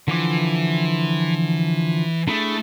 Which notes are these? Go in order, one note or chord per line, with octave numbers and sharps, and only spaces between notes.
D3 E3 F3 D6
A3 D4 E4 G#4